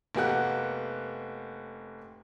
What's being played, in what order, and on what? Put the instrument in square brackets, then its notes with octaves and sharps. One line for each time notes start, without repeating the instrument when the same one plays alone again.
[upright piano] F1 A#3 B3 G4 F#5 F#6